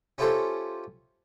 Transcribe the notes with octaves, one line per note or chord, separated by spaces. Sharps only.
C#4 E4 F4 G4 A4 C5